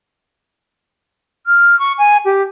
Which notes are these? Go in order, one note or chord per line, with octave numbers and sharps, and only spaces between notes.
F6
C#6
G#5
G4